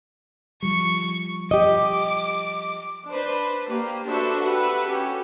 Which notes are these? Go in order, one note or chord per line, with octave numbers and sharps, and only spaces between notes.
F3 G3 C#6
G4 D#5 D6
D4 B4 C5
A#3 G4
D4 F#4 A4 B4 C5 E5
G4 B4 E5 F#5
C#4 F#4 G4 A4